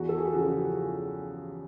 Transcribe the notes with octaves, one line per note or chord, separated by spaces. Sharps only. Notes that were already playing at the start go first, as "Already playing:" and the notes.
Already playing: E2 F#4
A4
G#4
G4
C#3 F3 F#4